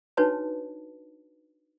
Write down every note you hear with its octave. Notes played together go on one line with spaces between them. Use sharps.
D4 D#4 F#4 B4 C#5 A5